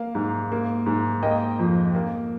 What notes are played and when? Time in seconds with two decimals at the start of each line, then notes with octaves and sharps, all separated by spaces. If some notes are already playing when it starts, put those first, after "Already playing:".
Already playing: A#3 F5
0.15 G#2
0.52 A#3
0.86 G#2
1.23 A#3 D#5 G5
1.59 F2
1.95 A#3